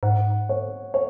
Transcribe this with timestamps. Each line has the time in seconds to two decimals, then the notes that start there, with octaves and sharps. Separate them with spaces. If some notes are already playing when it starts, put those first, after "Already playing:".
0.03 G#2 F#5
0.49 C#5
0.94 C#5